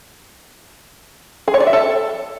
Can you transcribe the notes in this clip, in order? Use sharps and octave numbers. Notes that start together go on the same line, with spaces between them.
G#4
C#5
D5
E5
A4